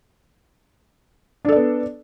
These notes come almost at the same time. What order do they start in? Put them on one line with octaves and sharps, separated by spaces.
D4 A4 D5 B3